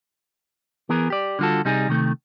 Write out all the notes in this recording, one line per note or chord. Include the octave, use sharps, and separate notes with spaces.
E3 B3 G#4 A#4
G4 D5
D3 G3 F4 F#4 A4
C3 G3 D#4 G#4
C3 D#3 A3